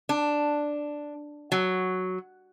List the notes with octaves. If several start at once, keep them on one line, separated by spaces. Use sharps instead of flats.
D4
F#3